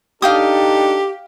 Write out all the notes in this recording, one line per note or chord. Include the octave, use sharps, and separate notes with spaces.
D4 D#4 G4 A4 F5 G5 D#6